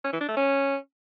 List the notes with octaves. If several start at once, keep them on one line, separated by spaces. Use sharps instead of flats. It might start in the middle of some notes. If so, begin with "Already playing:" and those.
C#4
E3
D4
A3
C#4